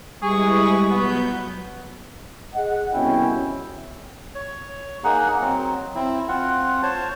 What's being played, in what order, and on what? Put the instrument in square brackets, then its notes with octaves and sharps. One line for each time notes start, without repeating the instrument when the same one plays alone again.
[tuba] G3 [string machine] G#3 E4 B4 [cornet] G#4 [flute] C#6
[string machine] B2 F#3 G6 [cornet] B3
[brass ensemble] G#4 D#5 F#5
C2 B2 C#4 E4 G5
[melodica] C#5
A#3 D#4 G#4 F#5
F#3 C4
C4 E4
C4 F4 F#5
C5 C#5 A5